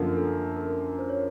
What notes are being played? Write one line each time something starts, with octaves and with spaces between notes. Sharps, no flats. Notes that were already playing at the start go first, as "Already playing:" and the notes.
Already playing: F#2 D3 F3 A#3
A4
A#4
C5
C#5